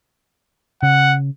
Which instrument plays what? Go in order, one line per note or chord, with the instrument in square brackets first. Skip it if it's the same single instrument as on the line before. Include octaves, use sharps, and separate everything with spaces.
[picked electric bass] C#3 [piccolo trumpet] F#5